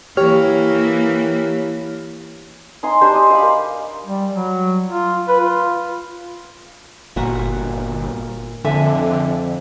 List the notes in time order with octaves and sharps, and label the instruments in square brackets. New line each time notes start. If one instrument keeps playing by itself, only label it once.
[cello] E3 A#3 [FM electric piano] G4 C#5 F6
[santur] D#4 G#5 C6
D4 G4 C5
D#5
C5 F5 B5
A#4
[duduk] G3
F#3
F4
B4
F4
[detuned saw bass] G1 [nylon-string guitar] A#2 F#4
[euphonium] F2 [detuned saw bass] D3 [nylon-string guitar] A4 E5 G#5